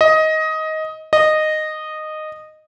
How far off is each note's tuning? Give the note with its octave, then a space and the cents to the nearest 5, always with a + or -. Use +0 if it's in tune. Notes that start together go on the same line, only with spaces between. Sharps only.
D#5 +15
D#5 -10